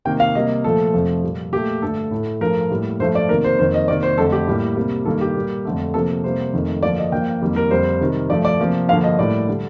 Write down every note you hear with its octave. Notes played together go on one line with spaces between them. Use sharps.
C3 D#3 A#3 G5
F5
C3 G3 A#3 D#5
A#2 F3 A3 A4
F2 C3 F3 A3
A#2 G3 A#3
A#2 A3 G4
G2 D3 A3 A4
A2 A3
G2 F3 A3 A#4
A2 G3 A#3
G2 F3 A3 C5
D5
C3 D#3 A#3 A#4
C5
F2 D#3 A#3 C5
D#5
C3 D#3 A#3 D5
C5
F2 D3 A3 A4
G4
A2 G3 A#3
C3 G3 A#3
G2 D#3 G3 A#3 A4
G4
A#2 G3 A#3
F2 D3 A3
C3 F3 A#3 A4
C3 G3 A#3 C5
F2 D#3 A3
G2 D3 F3 A#3 D5
D#5
G2 F3 A#3 G5
F2 D#3 G3 A#3
A#4
F2 D3 G3 C5
C3 D#3 G3
G2 F3 A3 D5
D5
C3 F3 A#3
G2 D3 F3 A#3 F5
D#5
A2 G3 A#3 D5
D3 G3